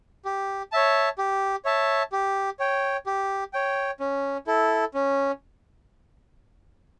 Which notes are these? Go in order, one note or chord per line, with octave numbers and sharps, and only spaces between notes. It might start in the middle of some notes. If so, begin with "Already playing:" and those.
G4
C#5 E5 A5
G4
C#5 E5 A5
G4
C#5 G5
G4
C#5 G5
C#4
E4 A4
C#4